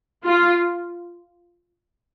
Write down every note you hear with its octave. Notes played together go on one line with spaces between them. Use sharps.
F4